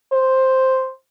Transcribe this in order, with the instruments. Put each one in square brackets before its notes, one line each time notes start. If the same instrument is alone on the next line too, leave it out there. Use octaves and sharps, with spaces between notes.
[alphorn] C5